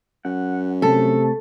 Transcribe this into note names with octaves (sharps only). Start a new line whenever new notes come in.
F#2 F#5
C3 A3 A4 A5